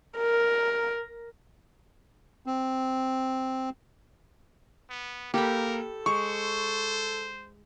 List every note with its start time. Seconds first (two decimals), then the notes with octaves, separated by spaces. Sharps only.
0.17 A#4
2.46 C4
4.90 B3
5.34 A#3 G4 A4 A#4 B5
6.06 G#3 C5 C#6